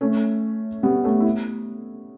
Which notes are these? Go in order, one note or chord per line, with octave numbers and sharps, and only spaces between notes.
A3 C#4
G3 B3
A3 C#4
E4